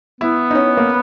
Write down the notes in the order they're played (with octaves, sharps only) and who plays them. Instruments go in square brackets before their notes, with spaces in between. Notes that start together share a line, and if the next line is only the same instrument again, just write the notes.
[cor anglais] B3 [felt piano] E4
[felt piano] D#4
C#4
A#3